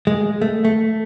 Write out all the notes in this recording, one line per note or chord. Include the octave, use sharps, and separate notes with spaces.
G#3
A3
A3